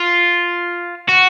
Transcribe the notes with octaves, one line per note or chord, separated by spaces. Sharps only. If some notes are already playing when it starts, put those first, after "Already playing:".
Already playing: F4
F#4